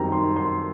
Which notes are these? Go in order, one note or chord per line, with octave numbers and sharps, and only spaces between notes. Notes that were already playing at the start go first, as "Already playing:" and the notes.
Already playing: F#2 D#3 G3 C4 A#5
C6
C6